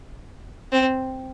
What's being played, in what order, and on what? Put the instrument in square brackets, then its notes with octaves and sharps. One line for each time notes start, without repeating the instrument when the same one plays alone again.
[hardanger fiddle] C4